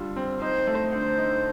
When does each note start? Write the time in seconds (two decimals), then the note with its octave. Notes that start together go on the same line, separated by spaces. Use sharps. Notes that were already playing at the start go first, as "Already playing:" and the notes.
Already playing: D3 G3 F4
0.16 C4
0.41 D#4 C5
0.67 A3
0.92 D3 C5
1.18 D#4